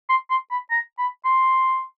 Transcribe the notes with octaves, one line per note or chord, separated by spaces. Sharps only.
C6
C6
B5
A#5
B5
C6